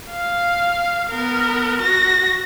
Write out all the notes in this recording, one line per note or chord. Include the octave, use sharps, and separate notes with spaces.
F5
B3 A#4
F#4 A#6